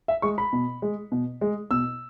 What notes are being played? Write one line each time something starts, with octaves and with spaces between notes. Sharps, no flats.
E5
G#3 C#6
B5
B2
G#3
B2
G#3
B2 E6